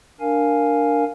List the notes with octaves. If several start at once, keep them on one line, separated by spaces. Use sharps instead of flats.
D4 A#4 F5 G#5